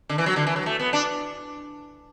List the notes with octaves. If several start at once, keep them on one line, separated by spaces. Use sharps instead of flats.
D3
E3
F#3
D3
E3
F#3
A3
B3
D4